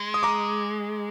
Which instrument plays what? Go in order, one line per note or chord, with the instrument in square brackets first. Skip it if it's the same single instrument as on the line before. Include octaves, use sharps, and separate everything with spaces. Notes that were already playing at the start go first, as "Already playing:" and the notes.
Already playing: [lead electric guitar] G#3
[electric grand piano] D#6
A#5 D6